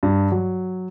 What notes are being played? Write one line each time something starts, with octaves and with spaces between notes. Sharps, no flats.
G2
F#3